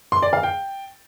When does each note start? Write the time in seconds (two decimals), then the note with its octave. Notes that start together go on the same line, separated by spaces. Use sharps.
0.12 C6
0.22 D5
0.33 F5
0.43 G5